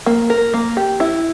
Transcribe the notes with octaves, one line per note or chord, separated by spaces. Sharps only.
A#3
A#4
A#3
G4
E4